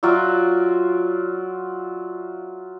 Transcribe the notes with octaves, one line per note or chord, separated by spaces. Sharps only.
F#3 F4 D5 E5